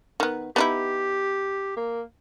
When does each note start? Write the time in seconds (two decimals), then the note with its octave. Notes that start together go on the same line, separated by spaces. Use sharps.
0.20 D#3 B3
0.56 B3 D#4 E4 G4
1.77 A#3